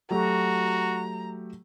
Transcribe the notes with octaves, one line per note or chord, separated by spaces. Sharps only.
F#3 A3 F#4 G4 A#5